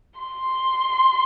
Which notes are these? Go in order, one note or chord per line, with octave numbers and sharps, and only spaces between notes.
C6